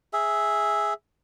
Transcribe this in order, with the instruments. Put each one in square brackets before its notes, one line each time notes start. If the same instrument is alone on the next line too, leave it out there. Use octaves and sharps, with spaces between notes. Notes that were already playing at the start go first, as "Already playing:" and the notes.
[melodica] G#4 E5